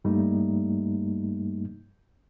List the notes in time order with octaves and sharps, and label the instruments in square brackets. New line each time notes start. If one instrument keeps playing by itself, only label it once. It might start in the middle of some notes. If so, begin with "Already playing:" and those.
[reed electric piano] G2 G3 A3 A#3 D#4